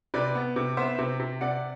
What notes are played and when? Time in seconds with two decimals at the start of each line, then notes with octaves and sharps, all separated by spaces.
0.14 C3 B4 D5
0.35 B3
0.56 C3
0.77 B3 C5 E5
0.99 C3
1.20 C3
1.41 C3 D5 F#5